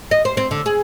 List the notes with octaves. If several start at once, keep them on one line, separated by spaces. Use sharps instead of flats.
D#5
C5
C4
D3
G#4